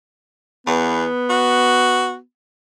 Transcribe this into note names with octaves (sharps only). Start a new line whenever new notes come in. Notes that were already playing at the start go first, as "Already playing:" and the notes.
E2 B3
F#4